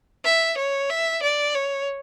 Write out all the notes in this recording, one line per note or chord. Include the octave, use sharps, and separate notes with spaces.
E5
C#5
E5
D5
C#5